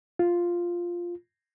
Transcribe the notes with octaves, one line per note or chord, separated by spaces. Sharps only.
F4